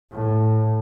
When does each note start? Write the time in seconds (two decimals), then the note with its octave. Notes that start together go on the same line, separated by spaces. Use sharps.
0.12 A2